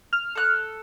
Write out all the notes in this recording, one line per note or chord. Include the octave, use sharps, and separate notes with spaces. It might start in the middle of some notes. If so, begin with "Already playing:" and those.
F6
A4 F#6